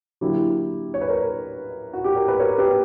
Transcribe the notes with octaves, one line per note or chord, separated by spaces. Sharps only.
D3 F#3 A#3 E4 G4
C#5
B4
A#4 C#5
F#4
G4
A#4
B4
A#4 C#5
G4 B4